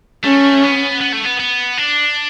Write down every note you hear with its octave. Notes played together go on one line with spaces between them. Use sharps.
A3 C#4
B3
B3
A3
B3
B3
D4